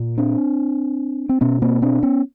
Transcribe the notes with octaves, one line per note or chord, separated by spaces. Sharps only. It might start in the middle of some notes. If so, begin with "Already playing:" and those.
Already playing: A#2
C4 D4
C4
B2 B3 C#4
A#3 C4
C4 D4
B3 C#4